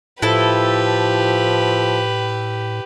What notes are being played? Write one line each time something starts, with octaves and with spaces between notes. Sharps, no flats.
A2 F3 E4 G4 A4 B4